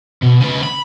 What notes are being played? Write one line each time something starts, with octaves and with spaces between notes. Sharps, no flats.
B2
C#3 B4
B5